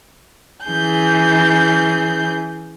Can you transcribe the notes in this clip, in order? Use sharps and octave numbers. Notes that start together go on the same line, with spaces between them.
E3 C#4 G#4 G6